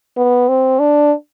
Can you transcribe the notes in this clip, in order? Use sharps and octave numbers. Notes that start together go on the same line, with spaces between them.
B3
C4
D4